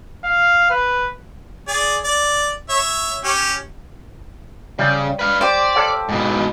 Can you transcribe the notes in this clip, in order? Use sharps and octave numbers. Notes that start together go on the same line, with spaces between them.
F5
B4
G#4 D5
D5
C#5 E5
C#4 G4
C#3 G3
B4 F5
G4 C5 D5
A4 C#5 F5
G#2 B2